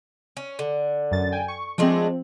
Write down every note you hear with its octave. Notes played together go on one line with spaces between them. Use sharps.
C#4
D3
F#2 A6
G5 G#5
C#6
F3 G#3 A3 C4 D4